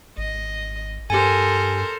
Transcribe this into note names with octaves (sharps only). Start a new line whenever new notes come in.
G#1 D#5
G2 G4 A4 A#4 C5 G#5